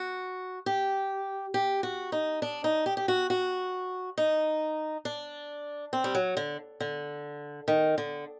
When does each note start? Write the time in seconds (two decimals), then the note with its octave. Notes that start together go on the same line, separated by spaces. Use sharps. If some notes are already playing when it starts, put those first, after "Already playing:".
Already playing: F#4
0.66 G4
1.54 G4
1.83 F#4
2.12 D#4
2.42 D4
2.64 D#4
2.86 G4
2.97 G4
3.08 F#4
3.30 F#4
4.18 D#4
5.05 D4
5.93 C4
6.04 G3
6.15 F#3
6.37 D3
6.80 D3
7.68 D#3
7.98 D3